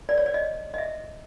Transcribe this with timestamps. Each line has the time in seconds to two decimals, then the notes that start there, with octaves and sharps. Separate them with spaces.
0.09 D5
0.18 C#5
0.26 D5
0.34 D#5
0.74 D#5
0.78 E5